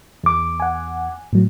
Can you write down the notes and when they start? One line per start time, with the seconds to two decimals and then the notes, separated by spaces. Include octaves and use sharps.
0.24 E2 D6
0.60 F#5 G#5
1.33 A2 F#3